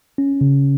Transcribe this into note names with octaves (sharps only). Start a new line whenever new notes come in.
C#4
C#3